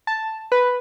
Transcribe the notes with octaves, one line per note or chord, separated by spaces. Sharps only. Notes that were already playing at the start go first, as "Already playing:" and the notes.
A5
B4